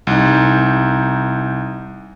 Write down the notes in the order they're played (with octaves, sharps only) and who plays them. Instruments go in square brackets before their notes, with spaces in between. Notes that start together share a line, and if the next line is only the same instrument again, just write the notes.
[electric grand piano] C2 D#4